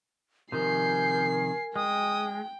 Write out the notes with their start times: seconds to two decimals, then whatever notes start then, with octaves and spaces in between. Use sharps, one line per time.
0.52 C3 D#3 F3 A#4 G#5 G6 C7
1.76 G#3 G5 D#6